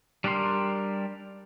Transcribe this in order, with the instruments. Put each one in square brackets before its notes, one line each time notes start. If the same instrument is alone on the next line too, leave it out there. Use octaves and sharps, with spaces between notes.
[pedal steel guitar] G3 D4 G4 A#4 C6